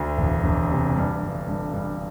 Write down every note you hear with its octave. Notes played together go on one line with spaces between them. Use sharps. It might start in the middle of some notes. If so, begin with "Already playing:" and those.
Already playing: D2
E1
E1
C3
G2
G1
G2
G2